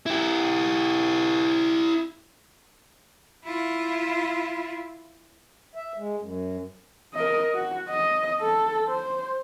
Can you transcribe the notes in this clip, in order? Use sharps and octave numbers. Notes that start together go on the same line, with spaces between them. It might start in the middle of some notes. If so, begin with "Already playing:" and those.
E4 G4
E4 F4
E5
G#3
F#2
A#4 D#5
F#4
D#5
A4
C5